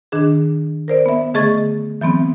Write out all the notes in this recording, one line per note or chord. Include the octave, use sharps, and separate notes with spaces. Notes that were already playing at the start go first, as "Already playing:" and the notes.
D#3 D4 G#4
A#4 C5 D5
B3 E5
D3 A3 G#4 D#5 C#6 A6
E3 F#3 B3 C4